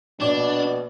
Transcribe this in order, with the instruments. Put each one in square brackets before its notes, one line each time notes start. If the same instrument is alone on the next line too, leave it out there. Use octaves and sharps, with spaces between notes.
[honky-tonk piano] A#1 D5 [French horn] B2 [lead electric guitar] D4